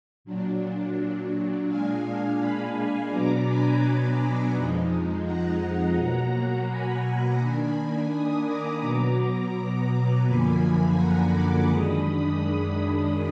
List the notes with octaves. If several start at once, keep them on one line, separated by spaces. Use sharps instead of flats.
A#2 F#3 D4
A#2 G#3 D4 F5 G#5
G#5 B5
B2 F#3 B3 D4 A#5 D6
G#5 B5
G#5 B5
F2 F3 G#3 D#4
F#5 A#5
B2 F#3 A#3
G#5 B5
D#3 A#3 D4
B5 D#6
A#5 D6
B2 F#3 B3 A#5 D6
F#2 D3 F3 A#3 G#5 B5
F#5 A#5
A#5 D6
F#2 D#3 G#3 D4 B5 D#6